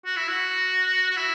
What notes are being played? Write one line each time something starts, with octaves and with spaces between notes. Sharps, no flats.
F#4
E4
F#4
F#4
E4